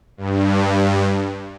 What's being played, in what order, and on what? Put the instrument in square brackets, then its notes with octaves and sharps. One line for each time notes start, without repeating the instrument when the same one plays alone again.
[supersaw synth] G2